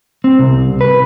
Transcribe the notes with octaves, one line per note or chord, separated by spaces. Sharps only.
C4
C2
B4